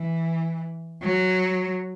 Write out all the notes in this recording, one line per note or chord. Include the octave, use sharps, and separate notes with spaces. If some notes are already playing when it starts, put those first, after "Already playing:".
Already playing: E3
F#3